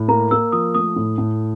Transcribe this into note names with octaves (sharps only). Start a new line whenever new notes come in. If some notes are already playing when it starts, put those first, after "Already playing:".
Already playing: A2
A#3 A#5
A#3 E6
F3 D#6
A3 D#6
A2
A2